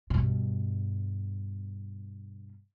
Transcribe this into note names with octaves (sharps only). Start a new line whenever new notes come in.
G2 B2